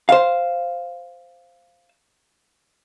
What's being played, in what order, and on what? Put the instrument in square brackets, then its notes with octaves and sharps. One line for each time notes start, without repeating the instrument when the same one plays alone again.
[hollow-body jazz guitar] C5 F5